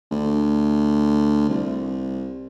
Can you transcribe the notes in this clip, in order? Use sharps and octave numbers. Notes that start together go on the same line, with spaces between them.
D2
C2